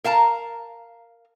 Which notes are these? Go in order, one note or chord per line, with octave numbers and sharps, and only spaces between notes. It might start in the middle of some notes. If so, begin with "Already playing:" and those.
A#4 F5 A5 A#5